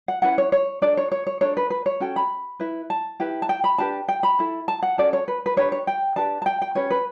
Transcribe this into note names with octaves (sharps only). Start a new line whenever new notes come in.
F#5
C#4 E4 B4 F#5
C#5
C#5
D4 A4 D5
C#5
C#5
C#5
D4 A4 C#5
B4
B4
C#5
C#4 F#4 A4 G5
B5
E4 B4
A5
E4 G4 B4
A5
G5
B5
D4 G4 B4 A5
G5
B5
E4 A4
A5
F#5
C#4 F#4 A4 D5
C#5
B4
B4
D4 G4 B4 C#5
C#5
G5
D4 G4 B4 A5
A5
G5
G5
C#4 G4 B4 C#5
B4